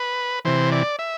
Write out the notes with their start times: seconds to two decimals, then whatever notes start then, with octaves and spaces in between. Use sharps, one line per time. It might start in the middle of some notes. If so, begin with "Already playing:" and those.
Already playing: B4
0.45 C3 E3 C5
0.72 D5
0.99 E5